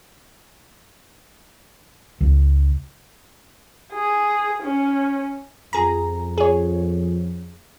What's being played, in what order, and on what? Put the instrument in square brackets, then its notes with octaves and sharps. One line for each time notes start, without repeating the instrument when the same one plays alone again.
[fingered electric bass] C#2
[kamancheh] G#4
C#4
[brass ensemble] F2 [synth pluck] G#4 A#5
[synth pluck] G#4 C#5